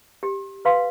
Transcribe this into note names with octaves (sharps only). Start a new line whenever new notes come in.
G4
B4 F5 C6